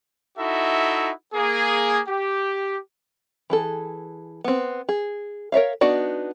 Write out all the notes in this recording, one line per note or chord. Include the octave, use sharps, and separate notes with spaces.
D#4 E4 F#4 A4 E5
A#3 G#4
G4
E3 G#4 A4
B3 C4
G#4
A#4 C#5 E5 F5
B3 D4 D#4 F#4 D5